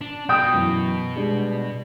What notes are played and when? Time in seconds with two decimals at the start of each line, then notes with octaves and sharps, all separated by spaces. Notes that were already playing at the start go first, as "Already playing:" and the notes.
0.01 D4
0.29 B2 G5 D#6
0.53 F#2 E3
1.16 G3 G#3 D4